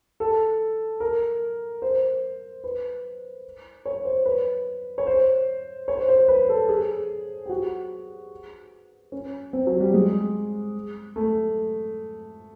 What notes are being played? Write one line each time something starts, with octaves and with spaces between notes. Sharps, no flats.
A4
A#4
C5
B4
C#5
C5
B4
C#5
C5
C#5
C5
C5
B4
A4
G#4
G4
F#4
C#4
C4
F#3
G3
G#3
A3